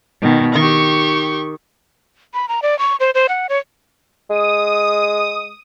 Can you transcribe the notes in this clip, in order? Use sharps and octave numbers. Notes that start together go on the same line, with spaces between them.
B2 D#3
D#3 G4 C#6
B5
A#5
D5
C#6
C5
C5
F#5
C#5
G#3 D#6